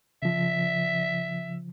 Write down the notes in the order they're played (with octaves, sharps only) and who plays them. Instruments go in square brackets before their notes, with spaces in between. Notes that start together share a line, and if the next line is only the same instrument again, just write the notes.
[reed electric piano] C#3 F3 [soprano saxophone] E5